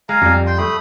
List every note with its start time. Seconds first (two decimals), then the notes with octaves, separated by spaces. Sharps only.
0.09 G#3 F5 G#5 A#5
0.22 F2 G3
0.47 G5 C6
0.58 A3 B5 D#6